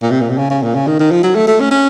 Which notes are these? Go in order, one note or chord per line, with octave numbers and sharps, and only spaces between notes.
A#2
C3
A#2
C3
C#3
C#3
A#2
C#3
D#3
D#3
F3
F#3
A3
A3
C#4
C#4